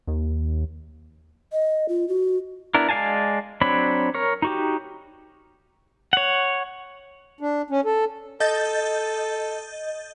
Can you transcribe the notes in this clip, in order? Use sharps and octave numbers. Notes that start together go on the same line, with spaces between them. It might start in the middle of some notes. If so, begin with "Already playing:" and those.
D#2
D#5
F4
F#4
B3 D4 E4 A#4
G#3 D5 F5 G#5 A5
F#3 C4 D4 C#5 B5
A#4 C#5
D#4 F#4 G4
C#5 F#5
D4
C#4
A4
A4 D#5 G6 A6